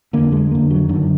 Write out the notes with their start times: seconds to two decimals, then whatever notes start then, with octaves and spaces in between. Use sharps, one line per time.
0.13 F2 D3 A#3
0.32 G#3
0.51 F2 D3 A#3
0.70 F#3
0.89 F#2 D3 D#3